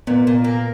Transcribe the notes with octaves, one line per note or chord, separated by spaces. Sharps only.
A#2 B3
A#2
A#3